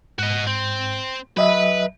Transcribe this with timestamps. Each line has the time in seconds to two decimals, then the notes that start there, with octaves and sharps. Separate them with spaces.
0.19 G#2 F#4 D#5
0.47 C4
1.37 F#3 B4 D#5 E5